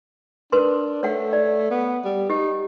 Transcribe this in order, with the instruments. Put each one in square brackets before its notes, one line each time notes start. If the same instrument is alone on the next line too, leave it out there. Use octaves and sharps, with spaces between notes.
[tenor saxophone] D4 [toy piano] A#4 B4 C6
[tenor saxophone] A3 [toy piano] C#5 F#5
[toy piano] D5
[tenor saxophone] B3
G3
[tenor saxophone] D#4 [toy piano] G4